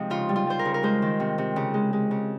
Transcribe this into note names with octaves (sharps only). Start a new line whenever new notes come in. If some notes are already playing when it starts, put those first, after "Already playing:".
Already playing: C3 F3 G#3 D#4
C#3 F4
G3
F4
G3 C5
A#4
C#3
A#4
G#3 C5
D#3
C3
C3
C#3
G#3
G#3
C#3